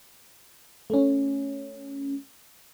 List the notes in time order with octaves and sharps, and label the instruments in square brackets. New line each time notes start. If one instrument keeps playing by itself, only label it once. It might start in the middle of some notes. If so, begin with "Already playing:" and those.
[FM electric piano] A3 C#4